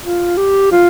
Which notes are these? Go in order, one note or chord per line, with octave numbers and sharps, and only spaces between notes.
F4
G4
F4